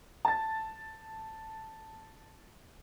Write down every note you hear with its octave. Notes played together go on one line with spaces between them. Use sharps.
A5 A6